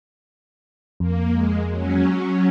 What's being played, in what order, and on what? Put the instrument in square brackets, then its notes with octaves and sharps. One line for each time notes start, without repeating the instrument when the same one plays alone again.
[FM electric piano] F2 [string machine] A#3
[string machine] G#3
F#3 C#4